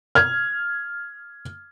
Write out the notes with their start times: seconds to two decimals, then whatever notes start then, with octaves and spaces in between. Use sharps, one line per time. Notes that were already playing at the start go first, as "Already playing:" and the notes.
0.15 F6 G#6